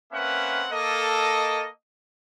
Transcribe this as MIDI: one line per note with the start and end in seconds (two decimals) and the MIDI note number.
0.13 0.64 58
0.13 0.64 60
0.13 0.64 61
0.13 0.64 71
0.13 0.64 76
0.13 0.64 78
0.70 1.67 58
0.70 1.67 69
0.70 1.67 75